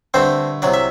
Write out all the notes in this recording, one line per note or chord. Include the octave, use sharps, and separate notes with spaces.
G2 D3 A3 C4 C5
C2 C3 F#3 D5
E5